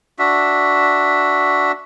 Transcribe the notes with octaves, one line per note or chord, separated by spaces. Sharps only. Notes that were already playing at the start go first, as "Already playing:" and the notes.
D4 F#4 E5